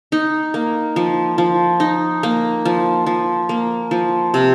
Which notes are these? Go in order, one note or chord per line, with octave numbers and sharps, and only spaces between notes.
D#4
A#3
F3
F3
D#4
A#3
F3
F3
A#3
F3
C3